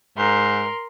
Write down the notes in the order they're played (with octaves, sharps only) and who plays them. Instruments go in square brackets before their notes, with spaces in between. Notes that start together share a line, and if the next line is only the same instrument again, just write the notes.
[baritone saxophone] G#2 [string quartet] A#4 C6